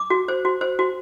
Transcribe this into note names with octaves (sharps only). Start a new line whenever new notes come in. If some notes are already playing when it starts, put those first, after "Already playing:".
Already playing: D6
F#4
C5
F#4
C5
F#4